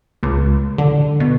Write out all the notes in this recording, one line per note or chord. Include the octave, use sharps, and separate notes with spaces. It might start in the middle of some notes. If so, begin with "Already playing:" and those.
C#2
D3
B2